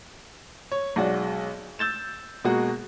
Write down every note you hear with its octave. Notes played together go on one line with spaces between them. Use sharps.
C#5
B1 G#3 F#4 D5
E6 G6 A6 E7
B2 G#3 A#3 F#4